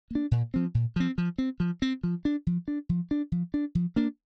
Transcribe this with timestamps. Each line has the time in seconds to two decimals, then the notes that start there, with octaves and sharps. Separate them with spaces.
0.11 A#3 D4
0.31 A#2
0.54 F3 C4
0.75 A#2
0.96 F3 C4
1.18 F3
1.38 C4
1.60 F3
1.82 C4
2.04 F3
2.25 D4
2.47 F3
2.68 D4
2.89 F3
3.11 D4
3.32 F3
3.54 D4
3.75 F3
3.96 A#3 D4